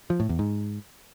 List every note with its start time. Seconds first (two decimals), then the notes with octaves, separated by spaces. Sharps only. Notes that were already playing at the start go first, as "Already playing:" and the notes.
0.10 F3
0.20 A2
0.29 E2
0.39 G#2